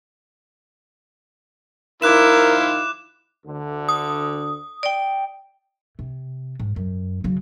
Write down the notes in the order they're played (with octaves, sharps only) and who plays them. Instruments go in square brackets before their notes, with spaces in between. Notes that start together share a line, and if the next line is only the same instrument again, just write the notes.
[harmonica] D#3 F3 F4 [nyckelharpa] E4 [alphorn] A#4 [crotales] D6 F#6 E7
[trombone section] D2 D3
[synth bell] D#6
[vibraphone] D5 G5
[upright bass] C3
G#2
F#2
C#3 F#3